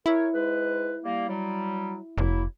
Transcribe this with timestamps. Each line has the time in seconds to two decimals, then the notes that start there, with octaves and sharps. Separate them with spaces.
0.06 E4 A#4 C#5
0.34 G#2 G#3 B4
1.05 G3 A#3
1.29 F#3 G3
2.18 F1 F#3 A#3 E4